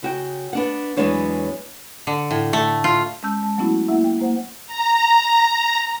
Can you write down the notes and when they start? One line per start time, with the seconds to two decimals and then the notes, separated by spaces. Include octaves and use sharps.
0.03 C#3 F#4 G5
0.53 B3 D4 F#5
0.97 E2 F#3 G#3 B3 D4 C#5
2.07 D3
2.31 A2
2.53 A3
2.84 F4
3.23 G#3 C#4 A5 E6 G6
3.43 G#3 A5
3.58 F#3 A3 B3 C#4 E4 F#4
3.88 A#3 E4 E5 F#5
4.04 G5
4.20 A#3 C5 F#5
4.67 A#5